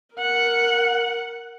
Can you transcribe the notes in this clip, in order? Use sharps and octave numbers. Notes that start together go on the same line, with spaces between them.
A#4 F#5